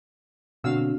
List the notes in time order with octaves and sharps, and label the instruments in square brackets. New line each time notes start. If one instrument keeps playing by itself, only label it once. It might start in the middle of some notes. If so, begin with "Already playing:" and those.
[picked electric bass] B2 D3 A#3 [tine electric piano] C4 D4 [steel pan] F#4 F5 E6